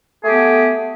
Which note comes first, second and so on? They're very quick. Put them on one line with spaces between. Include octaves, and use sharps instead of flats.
G#4 A3 G4 B3